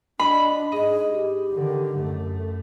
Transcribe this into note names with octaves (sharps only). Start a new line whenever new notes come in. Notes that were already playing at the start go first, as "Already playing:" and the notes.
D4 F#4 D#5 B5
G#2 G#4 D#5
G4
D3 D#3
F#2 A3